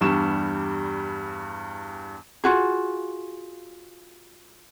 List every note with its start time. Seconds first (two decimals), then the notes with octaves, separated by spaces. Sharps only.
0.01 E2 G2 G3 C#6 E7
2.44 F4 F#4 G#4